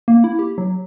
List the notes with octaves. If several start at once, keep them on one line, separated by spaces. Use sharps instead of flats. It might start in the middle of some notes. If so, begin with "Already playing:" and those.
A#3
E4
G4
F#3